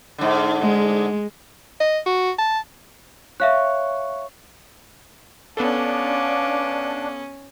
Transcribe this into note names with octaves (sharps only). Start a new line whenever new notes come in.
G#2 D3
G#3
D#5
F#4
A5
C#5 E5 F5 F#6
B3 C#4 D4 A4 F5 D6